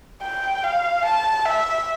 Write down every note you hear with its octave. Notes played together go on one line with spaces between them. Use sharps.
G5
F5
A5
E5